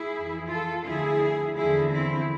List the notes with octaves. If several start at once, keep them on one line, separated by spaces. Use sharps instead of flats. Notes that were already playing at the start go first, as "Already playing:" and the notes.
Already playing: E4 G#4
F2 E3
F4 A4
D2 D3 F3 E4 G#4
E2 D3 F3 E4 G#4
C4 E4